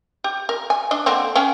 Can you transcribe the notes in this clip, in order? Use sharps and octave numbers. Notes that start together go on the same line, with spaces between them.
G4
A#4
G#5
D4 D#5
D3 A#3 C4
C#4 F5 G5